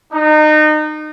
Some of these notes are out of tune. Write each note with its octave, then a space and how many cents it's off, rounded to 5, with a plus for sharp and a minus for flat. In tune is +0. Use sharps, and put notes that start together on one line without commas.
D#4 -30